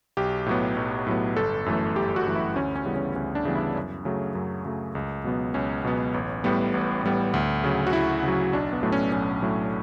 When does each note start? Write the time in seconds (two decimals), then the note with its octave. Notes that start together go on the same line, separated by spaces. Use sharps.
0.17 B1 G4
0.46 A2 F#3 B3
0.76 B1
1.07 A2 F#3 B3
1.36 G1 A4
1.66 F#2 E3 A3
1.96 G1 G4
2.16 F#4
2.26 F#2 E3 A3
2.35 E4
2.56 D2 C#4
2.76 C#4
2.85 C#3 E3 G3 B3
2.96 C#4
3.16 D2 C#4
3.35 D4
3.45 C#3 E3 G3 B3
3.55 E4
3.76 F#2
4.05 C#3 F#3 A3
4.35 F#2
4.65 C#3 F#3 A3
4.95 C#2
5.24 B2 F#3 B3
5.54 C#2 C#4
5.85 B2 F#3 B3
6.14 A1
6.44 A2 G3 B3
6.74 A1
7.04 A2 G3 B3
7.34 D2
7.64 C#3 F#3
7.87 F#4
7.93 D2 E4
8.23 C#3 F#3
8.53 B1 D4
8.73 B3
8.83 A2 F#3 A3
8.92 C#4
9.12 B1 C#4
9.42 A2 F#3 A3